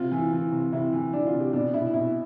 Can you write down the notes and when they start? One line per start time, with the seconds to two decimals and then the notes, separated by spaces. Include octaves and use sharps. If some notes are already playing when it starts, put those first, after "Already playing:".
Already playing: C3 F4
0.12 E3
0.33 E3
0.52 C3
0.72 C3 E4
0.93 E3
1.13 E3 D4
1.27 F4
1.33 C3
1.40 G4
1.53 B2 D4
1.74 B2 E4
1.94 B2 E4